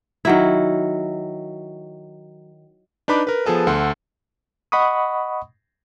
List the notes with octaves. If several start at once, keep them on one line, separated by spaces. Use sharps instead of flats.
D#3 F#3 E4
D4 D#4 B4 B5 D6
A#4 B4
F3 B3 G#4 A4 B4
D2 A4 F#5 C6
D#5 F#5 B5 C#6 D#6